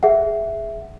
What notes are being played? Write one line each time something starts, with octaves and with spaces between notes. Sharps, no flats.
G#4 E5 F#5